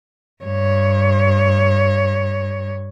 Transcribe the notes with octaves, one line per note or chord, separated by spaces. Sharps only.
G2 C#5